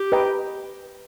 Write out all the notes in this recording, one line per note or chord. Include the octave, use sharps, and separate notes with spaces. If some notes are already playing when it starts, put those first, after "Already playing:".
Already playing: G4
B4 D#5 G5 A#5